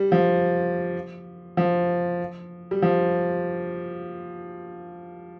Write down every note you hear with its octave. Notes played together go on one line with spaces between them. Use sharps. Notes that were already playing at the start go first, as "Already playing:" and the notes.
Already playing: G3
F3
F3
G3
F3